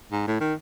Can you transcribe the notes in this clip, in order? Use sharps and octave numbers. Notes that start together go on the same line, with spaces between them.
G#2
A2
D#3